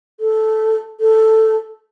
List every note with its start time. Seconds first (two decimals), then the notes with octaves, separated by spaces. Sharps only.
0.20 A4
1.00 A4